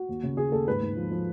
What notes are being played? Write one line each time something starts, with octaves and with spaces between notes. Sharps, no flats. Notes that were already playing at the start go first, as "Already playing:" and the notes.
Already playing: F#4
D#2
C#3
C#3 G#4
D#2 A4
G#2 B4
G#2
F3
F3